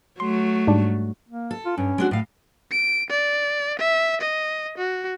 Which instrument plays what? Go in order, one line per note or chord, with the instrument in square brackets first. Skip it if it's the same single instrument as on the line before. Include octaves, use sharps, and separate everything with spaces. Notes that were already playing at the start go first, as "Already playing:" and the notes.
[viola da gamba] F#3 A3 [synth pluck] C6
[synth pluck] G#2 G3 D4
[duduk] A#3
[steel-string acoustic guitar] A4
[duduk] F4
[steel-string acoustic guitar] G2 [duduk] C#4
[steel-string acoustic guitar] G#3 D4 F#4
A2 F5
[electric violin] D7
D5
E5
D#5
F#4